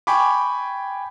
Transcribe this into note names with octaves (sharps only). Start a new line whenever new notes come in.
G5 G#5 B5 C#6 D6